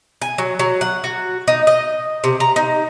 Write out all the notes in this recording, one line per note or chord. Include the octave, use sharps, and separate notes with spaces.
G#5
F#3
F#3
F#5
F#4
D#4
D#5
C3
A#5
D#4